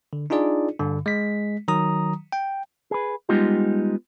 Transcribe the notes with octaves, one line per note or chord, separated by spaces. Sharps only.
D3
D4 D#4 F4 G#4 D5
G2 D3
G#3 B6
D#3 F#3 A#5 D#6
G5
G#4 B4
G3 G#3 B3 D#4 F4 G4